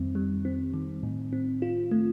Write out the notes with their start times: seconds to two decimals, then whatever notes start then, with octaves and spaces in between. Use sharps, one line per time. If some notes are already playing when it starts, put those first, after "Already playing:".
Already playing: F2 D#3 G3 C4
0.15 G3
0.45 C4
0.74 D#3
1.03 A2
1.33 C4
1.62 F4
1.91 A3